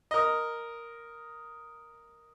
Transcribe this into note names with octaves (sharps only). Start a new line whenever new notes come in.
A#4 D#5